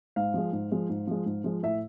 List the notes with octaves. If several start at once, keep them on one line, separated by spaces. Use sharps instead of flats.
G#2 F5
F3 G#3
G#2
F3 G#3
G#2
F3 G#3
G#2
F3 G#3
A2 E5